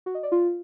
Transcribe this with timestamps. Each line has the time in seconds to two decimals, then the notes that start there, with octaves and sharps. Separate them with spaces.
0.06 F#4
0.15 D#5
0.23 D5
0.32 F4